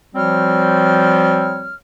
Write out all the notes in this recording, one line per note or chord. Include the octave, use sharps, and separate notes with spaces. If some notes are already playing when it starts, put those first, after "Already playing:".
F3 G3 C4 F#4 C#5 F6